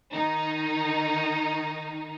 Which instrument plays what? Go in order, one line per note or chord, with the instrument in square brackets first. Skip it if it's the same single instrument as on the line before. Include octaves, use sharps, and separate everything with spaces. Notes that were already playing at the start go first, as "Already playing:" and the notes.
[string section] D#3 D#4